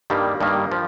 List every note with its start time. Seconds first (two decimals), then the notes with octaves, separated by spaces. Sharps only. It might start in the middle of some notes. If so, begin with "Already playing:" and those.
0.10 G2 D#3 G3 A#3
0.40 G2 D#3 G3 A#3
0.72 F3